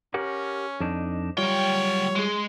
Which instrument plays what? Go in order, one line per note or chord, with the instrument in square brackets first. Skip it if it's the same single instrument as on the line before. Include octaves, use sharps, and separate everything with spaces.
[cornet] C#4 [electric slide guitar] G4 A#4 F#5
[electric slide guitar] F2 D4 D#4
[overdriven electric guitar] F#3 G5 [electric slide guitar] G3 F4 [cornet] C#5
[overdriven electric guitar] G#3 G#4